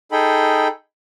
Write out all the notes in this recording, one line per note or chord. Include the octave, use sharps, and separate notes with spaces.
D#4 G#4 A4 G5 B5